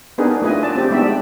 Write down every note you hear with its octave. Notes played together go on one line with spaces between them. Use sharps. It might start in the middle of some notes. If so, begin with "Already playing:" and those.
B3 D4 D#4 G#4 A#4 B4
A3 F4 B4 D#5 G#5
D5 A5
C4 G4
G#3 B3 D4 D#4 D5 E5
D5